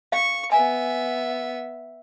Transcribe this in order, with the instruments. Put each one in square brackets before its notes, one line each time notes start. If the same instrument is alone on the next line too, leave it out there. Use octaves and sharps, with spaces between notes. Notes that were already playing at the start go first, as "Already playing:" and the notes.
[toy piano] F5 [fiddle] C#6
[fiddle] B3 E5 [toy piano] G#5